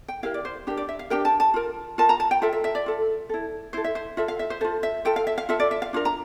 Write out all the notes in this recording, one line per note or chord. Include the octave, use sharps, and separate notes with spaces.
G5
E4 G4 A#4 F5
D5
C5
D4 G4 A#4
D5
E5
F5
D4 G4 A#4 G5
A5
A5
F4 A#4
F4 A#4 A5
A#5
A5
G5
F4 A4 E5
E5
E5
D5
F4 A4
E4 A4
E4 A4 C5
E5
C5
F4 A4 E5
F5
E5
C5
F4 A4 C5
E5
F4 A4 G5
F5
E5
F5
F4 A4 E5
D5
E5
F5
D4 F4 A#4
A#5